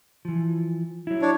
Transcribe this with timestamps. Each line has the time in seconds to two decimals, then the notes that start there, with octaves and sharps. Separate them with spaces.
0.25 E3 F3
1.07 F#3 E4
1.22 D4 C#5